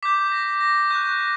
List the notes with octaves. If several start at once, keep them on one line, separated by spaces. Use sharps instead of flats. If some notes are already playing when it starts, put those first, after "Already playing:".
D6 G6 B6
A#6
A#6
C#6 F#6 G6
A#6